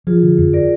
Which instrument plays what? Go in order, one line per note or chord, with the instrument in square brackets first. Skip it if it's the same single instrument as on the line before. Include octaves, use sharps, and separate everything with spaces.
[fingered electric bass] F3 [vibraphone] F4 G#4
[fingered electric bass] D3
F2
[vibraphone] A#4 D5